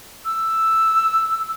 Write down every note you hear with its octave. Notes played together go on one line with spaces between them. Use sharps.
E6